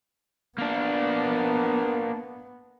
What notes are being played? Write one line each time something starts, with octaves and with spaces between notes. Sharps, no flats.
A#3 B3 D4